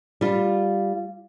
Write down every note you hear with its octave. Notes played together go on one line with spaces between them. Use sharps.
G3 F4